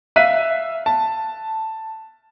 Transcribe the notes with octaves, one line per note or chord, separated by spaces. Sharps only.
E5 F5 F#6 B6 D#7
A5